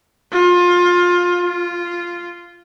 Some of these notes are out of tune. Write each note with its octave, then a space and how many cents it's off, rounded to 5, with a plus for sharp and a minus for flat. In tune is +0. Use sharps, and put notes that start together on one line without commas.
F4 +20
F4 -5